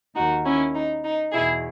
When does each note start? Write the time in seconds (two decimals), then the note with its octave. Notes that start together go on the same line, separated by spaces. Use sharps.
0.15 D#2 D#3 D#4 F#4
0.45 C#4 E4
0.74 D#4
1.03 D#4
1.32 E2 B2 E4 G#4